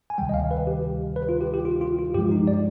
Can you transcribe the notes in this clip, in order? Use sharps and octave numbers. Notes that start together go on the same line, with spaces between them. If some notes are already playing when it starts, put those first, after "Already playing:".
G#5
D2 C3 D#3 G3 G5
D#5
F5
B4
G4
B4
F4
G4
G4
F4
F4
F4
G2 F3 G#3 G4
D#4
D5